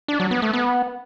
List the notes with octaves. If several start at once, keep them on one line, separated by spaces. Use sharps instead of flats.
D4
F#3
B3
A3
B3